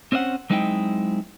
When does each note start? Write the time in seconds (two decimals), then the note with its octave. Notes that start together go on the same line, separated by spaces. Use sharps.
0.12 C4 C#4 C5 D#5 F#5
0.50 F#3 G#3 C4 D#4 E4 G5